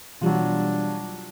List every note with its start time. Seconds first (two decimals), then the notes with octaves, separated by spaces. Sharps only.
0.21 B2 E3 F#3 G3 D4 F4